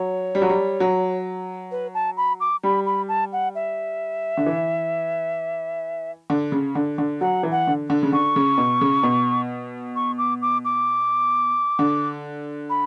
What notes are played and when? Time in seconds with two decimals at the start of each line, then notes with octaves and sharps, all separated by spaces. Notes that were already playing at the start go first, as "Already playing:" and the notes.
Already playing: F#3 C#5
0.35 G3
0.42 F#3
0.49 G3
0.80 F#3
1.71 B4
1.94 A5
2.17 B5
2.40 D6
2.63 G3 B5
2.86 B5
3.08 A5
3.33 F#5
3.55 E5
4.37 D3
4.46 E3
6.30 D3
6.52 C#3
6.75 D3
6.98 D3
7.21 F#3 F#5
7.43 E3
7.51 F#5
7.67 D3
7.90 D3
8.03 C#3
8.12 D3 C#6
8.36 C#3
8.58 B2
8.81 C#3
9.03 B2
9.96 C#6
10.18 D6
10.42 D6
10.65 D6
11.79 D3
12.70 B5